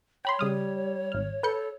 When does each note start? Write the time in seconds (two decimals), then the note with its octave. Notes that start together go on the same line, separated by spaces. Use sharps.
0.25 C#5 G5 B5 C6
0.39 C#3 G3 D#6 F6
1.12 G#1 F6
1.43 A4 B4 G6 C#7